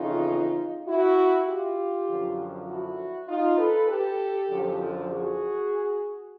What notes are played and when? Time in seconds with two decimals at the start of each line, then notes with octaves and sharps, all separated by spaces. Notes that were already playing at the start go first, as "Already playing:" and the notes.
Already playing: F2 C#3 E3 D#4 F4
0.87 E4 F#4
1.48 F4 G4
2.08 F#2 D3 F3
2.67 E4 F#4
3.28 D#4 F4
3.58 A4 B4
3.88 G4 A4
4.49 F#2 D3 F3
5.08 F#4 G#4